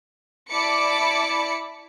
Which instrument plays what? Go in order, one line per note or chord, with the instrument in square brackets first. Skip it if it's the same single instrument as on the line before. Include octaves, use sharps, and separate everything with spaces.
[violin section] E4 D5 A5 B5 D6 C#7